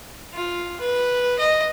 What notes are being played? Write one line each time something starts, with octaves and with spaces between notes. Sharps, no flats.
F4
B4
D#5